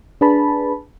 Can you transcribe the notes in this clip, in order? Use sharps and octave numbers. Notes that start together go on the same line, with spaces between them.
D4 G#4 B4 A5 B5